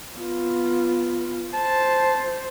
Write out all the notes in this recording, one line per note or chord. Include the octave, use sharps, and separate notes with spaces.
B3 F4
C5 A5